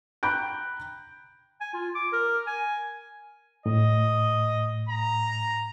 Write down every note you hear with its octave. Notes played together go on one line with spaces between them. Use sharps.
G5 A#5 B5 F#6 G6 D7
G#5
F4
D6
A#4
G#5
A2 D#5
A#5